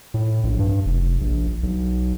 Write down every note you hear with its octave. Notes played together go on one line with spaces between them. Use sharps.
A2
A#1
G2
F1
A#1
B1